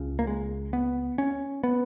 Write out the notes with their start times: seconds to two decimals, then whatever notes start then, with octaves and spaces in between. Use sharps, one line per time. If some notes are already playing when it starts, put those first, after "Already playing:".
Already playing: C#2 C#3
0.19 A#3
0.27 G#3
0.73 B3
1.18 C#4
1.64 B3